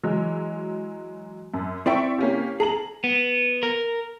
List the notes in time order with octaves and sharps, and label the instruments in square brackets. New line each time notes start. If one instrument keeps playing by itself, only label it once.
[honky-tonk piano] E3 F#3 G#3
F#2
[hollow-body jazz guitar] C4 E4 G5 [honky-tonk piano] D5 E5 C#6
[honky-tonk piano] A#3 C#4 G4
[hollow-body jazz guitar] G#4 [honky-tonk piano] A5 A#5 F#7
[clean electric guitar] B3
A#4